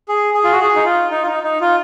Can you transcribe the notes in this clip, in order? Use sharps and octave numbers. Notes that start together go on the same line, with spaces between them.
G#4
G#4
F4
F#4
G#4
D#4
F4
D#4
F4
D#4
D#4
F4